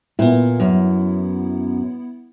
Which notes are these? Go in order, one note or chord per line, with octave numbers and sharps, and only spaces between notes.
A#2 B3 E4
F#2